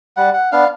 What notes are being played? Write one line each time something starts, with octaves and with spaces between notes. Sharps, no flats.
G3 F#5
F#5
B3 D4 F5